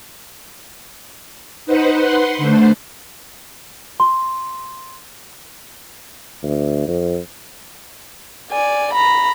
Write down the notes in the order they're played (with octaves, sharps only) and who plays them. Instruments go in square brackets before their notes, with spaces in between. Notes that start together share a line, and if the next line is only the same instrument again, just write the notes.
[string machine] D#4 B4 C5 F#5
B4 F#5 C6
D3 A3 C5
[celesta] C6
[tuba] D2
F2
[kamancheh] D5 G#5
A#5 B5